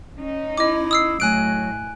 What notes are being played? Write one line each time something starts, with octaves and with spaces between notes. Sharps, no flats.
C#4 D#4
E4 D#5 D6
D#6 E6 C7
A2 F#3 G#5 F#6 D7